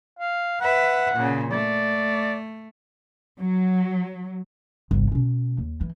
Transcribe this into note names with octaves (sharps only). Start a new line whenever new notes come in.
F5
B4 E5 F#5
A#2 C#3
A3 D5
F#3
G1 C2
B2 C#4
D#2
E3